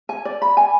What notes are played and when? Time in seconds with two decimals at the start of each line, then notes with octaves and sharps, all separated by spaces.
0.09 G#5
0.25 D5
0.42 B5
0.57 G#5